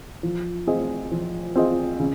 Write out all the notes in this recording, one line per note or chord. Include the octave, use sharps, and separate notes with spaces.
F3
C4 F4 G#4 D#5
F3
C4 F4 G#4 D#5
C#3